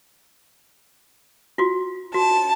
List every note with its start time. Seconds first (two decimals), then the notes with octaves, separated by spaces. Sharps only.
1.58 F4 F#4
2.14 F#4 A5